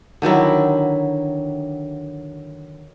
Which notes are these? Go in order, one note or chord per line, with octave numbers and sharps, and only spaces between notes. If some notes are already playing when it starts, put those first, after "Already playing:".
D3 D#3 F#3 E4